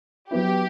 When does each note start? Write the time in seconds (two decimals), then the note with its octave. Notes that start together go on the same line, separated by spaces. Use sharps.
0.30 F#3 B3 E4 G4